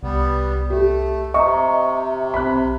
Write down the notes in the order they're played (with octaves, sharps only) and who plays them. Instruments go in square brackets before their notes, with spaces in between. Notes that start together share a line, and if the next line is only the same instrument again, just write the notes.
[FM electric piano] C2 [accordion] G3 B3
[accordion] A3 [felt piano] G4
[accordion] C3 [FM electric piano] D#5 [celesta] E5 A#5 [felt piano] C#6
[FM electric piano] B1 C4 [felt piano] B5 F#6